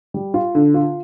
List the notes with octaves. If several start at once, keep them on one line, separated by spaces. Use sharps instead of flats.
G3
F4
D3
F4